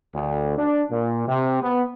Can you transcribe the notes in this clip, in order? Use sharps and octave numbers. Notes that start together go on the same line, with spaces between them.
D2
D4
A#2
C3
B3